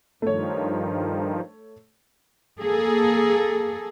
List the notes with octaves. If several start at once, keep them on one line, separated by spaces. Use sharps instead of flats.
G2 D#3 F3 A3 C#5
A#3 G#4 A4